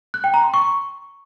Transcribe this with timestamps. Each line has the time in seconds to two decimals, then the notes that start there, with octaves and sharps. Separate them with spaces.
0.14 F#6
0.24 G5
0.34 A#5
0.44 C6
0.54 C#6